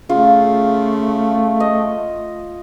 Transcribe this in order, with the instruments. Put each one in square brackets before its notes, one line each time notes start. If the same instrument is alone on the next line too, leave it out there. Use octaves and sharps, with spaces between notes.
[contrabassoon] C#3 [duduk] A3 [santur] F4
[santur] D#5